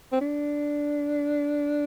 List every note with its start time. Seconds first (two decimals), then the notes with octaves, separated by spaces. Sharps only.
0.13 C4
0.21 D4